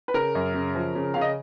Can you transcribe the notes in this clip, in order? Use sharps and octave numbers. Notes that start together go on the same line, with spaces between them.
B4
C#3 A#4
F#2
C#3
F3
C#3
C#3 F5
D#5